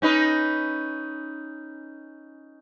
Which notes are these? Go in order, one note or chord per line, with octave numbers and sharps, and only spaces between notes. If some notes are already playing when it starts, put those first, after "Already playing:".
C#4 D#4 B4